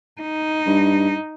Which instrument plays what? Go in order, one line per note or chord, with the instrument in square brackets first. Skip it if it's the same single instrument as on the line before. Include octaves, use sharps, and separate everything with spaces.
[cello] D#4
[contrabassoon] G2